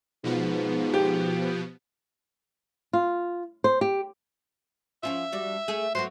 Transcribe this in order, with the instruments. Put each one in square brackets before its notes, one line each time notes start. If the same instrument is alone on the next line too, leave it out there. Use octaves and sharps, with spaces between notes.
[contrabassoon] G#2 [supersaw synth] B2 F3 B3
[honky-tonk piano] G4
[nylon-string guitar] F4
C5
G4
[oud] F3 C#4 F4 [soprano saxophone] E5
[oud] G3 D4 F#4
A3 G#4
[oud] F#3 B3 F#4 [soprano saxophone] C5